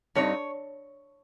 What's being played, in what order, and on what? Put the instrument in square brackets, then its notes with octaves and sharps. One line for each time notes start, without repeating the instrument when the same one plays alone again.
[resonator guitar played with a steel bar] G2 G3 C4 D#4 C#5